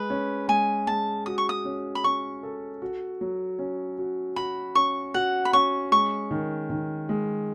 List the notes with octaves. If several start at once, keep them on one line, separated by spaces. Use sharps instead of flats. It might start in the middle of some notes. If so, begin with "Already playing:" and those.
Already playing: G#3 B4
C#4
G#3 G#5
G#3 A5
F#4 D#6
C#6
D#6
C#4
B5
C#4 C#6
A4
F#4
F#3
C#4
F#4
F#4 B5
C#4 C#6
F#4 F#5
B5
C#4 C#6
G#3 C#6
D#3
D#3
G#3